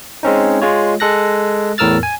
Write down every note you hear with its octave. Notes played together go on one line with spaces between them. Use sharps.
G#3 C4 C#4 D#4
G#3 F4 C#5
G#3 A4 F#6 A#6
E2 A2 A#4 E6 F6 A6
G#5